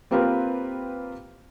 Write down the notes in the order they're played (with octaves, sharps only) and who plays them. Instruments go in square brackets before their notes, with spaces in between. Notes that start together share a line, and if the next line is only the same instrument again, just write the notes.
[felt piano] A#3 C4 F4 G4 A#4 B4